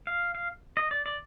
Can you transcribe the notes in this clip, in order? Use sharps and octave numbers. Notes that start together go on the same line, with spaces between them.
F5
F5
D#5
D5
D5